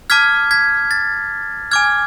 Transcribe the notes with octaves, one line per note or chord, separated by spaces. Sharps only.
A5 D6 F6 G#6 B6
G#6 B6
A6
G#5 D6 F6 G#6